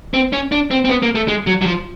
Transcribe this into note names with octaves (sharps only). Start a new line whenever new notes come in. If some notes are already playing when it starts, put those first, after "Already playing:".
C4
C#4
D4
C4
C4
B3
A#3
A3
G#3
F#3
F#3
F3